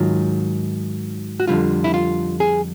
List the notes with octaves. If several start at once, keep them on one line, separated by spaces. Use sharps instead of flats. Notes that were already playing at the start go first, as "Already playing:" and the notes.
Already playing: G#2 D#3 F#3 F4
F#4
F2 D3 G3 F4
E4
F4
G#4